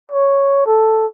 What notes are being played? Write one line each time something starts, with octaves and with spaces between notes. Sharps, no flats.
C#5
A4